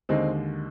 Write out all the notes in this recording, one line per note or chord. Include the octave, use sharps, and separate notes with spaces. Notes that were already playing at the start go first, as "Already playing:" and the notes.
D#2 D3 G#3 C4 D#4